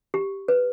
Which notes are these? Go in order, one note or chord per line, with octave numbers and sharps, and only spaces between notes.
G4
B4